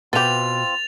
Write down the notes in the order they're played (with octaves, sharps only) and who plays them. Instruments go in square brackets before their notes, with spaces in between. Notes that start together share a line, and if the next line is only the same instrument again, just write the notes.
[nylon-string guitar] B2 [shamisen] B3 G4 [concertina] C4 F4 [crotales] A6 F7